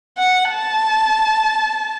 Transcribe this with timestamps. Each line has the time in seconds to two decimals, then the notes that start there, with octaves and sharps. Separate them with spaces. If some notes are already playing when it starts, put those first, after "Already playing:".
0.18 F#5
0.51 A5